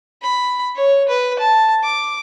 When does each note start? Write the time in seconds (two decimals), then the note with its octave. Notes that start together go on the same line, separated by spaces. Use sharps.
0.23 B5
0.76 C#5
1.09 B4
1.39 A5
1.84 D6